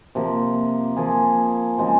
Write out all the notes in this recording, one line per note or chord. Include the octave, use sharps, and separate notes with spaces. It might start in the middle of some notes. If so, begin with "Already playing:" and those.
C3 F3 A#3
F3 A#3 F4 G#4
C#3 F3 G#3 C4